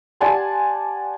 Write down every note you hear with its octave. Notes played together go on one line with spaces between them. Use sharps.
G4 D5 F#5 G#5 A5 C6